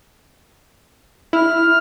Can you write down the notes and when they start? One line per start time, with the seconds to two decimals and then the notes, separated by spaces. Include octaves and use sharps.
1.33 E4 F6